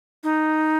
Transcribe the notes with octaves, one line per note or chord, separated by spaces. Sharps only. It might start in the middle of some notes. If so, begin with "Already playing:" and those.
D#4